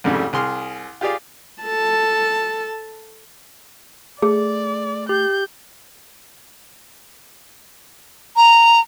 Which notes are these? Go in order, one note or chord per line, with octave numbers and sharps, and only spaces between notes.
C2 F2 G#2 C#3 G3 A3
C2 G#4 C6 F6
F4 G4 G#4 D5 F5
A4 A5
A3 G#4 D5
G4 G6
A#5